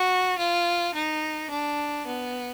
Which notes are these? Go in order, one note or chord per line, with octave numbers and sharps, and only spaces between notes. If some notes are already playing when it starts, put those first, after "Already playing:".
Already playing: F#4
F4
D#4
D4
B3